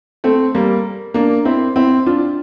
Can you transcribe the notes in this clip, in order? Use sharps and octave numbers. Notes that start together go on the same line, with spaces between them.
A3 C4
G3 A#3
A#3 D4
C4 E4
C4 E4
D4 F4